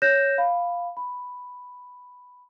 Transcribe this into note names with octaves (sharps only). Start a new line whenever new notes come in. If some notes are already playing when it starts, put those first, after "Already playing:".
C#5 F#6 G6 A#6 E7
F5 B5
B5